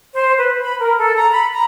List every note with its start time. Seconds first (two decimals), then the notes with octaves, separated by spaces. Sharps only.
0.13 C5
0.37 B4
0.60 B5
0.80 A#4
0.97 A4
1.15 A#5
1.31 B5
1.51 A#5